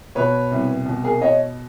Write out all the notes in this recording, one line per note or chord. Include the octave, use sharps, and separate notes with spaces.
B2 B4 C#5
C2
B2
G#4 A#4
C#5 D#5